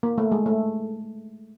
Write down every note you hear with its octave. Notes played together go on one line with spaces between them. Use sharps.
A#3
A3
G#3
A3